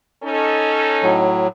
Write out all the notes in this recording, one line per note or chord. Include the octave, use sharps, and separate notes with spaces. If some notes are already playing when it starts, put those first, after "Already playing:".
C#4 D#4 A4
A2 F#3